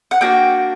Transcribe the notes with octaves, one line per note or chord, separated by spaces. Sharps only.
F#5
A#3 D4 F#4 G5